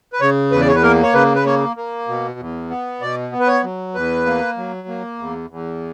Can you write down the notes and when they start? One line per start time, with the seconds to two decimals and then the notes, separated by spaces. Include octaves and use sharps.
0.13 B4
0.21 C#3 C#5
0.51 E2 B4
0.61 D5
0.68 C#5
0.75 B4
0.83 A#3 A#4
1.03 C#5
1.14 C#3 B4
1.35 B4
1.46 A#3 C#5
1.76 A#3
2.08 B2
2.39 E2
2.70 B3
3.01 B2 D5
3.32 B3
3.40 B4
3.48 C#5
3.63 F#3
3.95 E2 B4
4.26 A#3
4.57 F#3
4.88 A#3
5.19 E2
5.50 E2